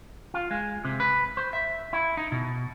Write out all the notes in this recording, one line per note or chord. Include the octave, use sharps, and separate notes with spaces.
F4
G#3
C3
B4
C5
E5
E4
D#4
B2